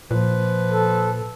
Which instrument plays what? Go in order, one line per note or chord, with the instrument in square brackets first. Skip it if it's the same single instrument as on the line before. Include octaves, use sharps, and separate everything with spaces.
[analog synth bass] A#2 [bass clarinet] F3 [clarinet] B4
[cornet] A4